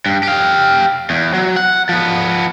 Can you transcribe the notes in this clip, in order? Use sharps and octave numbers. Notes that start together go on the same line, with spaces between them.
G2
G4 F5
E2
F#3
F#5
F3 B3